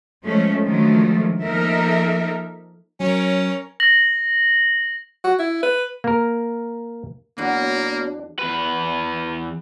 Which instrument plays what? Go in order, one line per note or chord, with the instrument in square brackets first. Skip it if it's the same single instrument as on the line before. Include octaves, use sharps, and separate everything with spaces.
[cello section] F3 G#3 A3 C#4
D3 D#3 F3 F#3 G#3 A3
F3 A#3 D#4 A4 A#4 E5
[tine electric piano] F#3 [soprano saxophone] C#4 [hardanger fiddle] A#4 C#5
[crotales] A#6 F#7
[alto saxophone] F#4
E4
B4
[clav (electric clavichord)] A#3 A#4
[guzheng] E2 F#3 F#5 [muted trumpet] A#3 [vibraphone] B3 F#4 C#5 [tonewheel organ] D4
[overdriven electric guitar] E2 B4